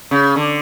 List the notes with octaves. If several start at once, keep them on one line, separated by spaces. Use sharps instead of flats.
C#3
D3